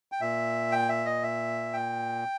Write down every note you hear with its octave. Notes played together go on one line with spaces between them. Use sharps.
G5
A#2 E5
G5
E5
D#5
E5
G5